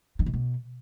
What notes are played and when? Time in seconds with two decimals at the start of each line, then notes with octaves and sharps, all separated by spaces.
0.19 D#3
0.26 C3
0.34 B2